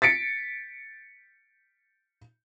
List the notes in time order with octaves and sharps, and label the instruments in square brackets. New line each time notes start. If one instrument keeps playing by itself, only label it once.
[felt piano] A6 B6 C#7 D7